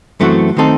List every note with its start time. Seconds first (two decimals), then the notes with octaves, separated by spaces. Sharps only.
0.20 F#2 E3 A3 C4 F#4
0.57 D#3 A3 C4 D#4 A4